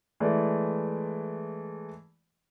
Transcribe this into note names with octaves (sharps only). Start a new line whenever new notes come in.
E3 G#3 A3 D5